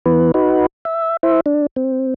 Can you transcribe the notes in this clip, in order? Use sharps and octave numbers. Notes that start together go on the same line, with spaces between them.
E3 B3 B4
D#4 F#4 B4
E5
E4 C5 E5
D4
C4